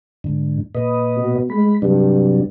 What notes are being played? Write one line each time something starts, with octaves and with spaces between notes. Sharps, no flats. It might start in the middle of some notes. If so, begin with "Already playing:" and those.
G#2 D3
A#2 B4 D#5
B2
G#3 B5
G2 C3 F#3 D4